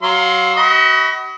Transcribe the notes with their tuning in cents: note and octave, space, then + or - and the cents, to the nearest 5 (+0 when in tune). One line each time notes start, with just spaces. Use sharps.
F#3 +25 F5 +20 C6 +0
F#4 +30 D#5 +40 B5 +0